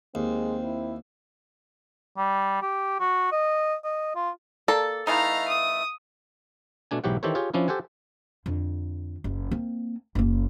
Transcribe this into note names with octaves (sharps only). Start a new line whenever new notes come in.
D#2 G#3 C4
E4
G3
G4
F#4
D#5
D#5
F4
A#3 A4 D5
E3 A3 D#4 F5 A#5
D#6
B2 A3 D4 G#5
B1 G#2 E3 G4 C#5 F#5
D#3 E3 G4 A4 C5 C#5
F4 G4 G#4 C#5
F3 C#4 D4 E4
G4 A4 C5 F#5 G#5
F2 D3
F#1
A#3 C4
F#1 A#3